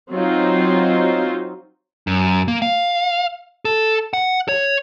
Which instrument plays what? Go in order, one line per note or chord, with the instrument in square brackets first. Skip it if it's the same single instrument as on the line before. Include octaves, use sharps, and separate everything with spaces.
[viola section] F#3 C4 D#4 F4 C5
[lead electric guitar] F#2
A#3
F5
A4
F#5
C#5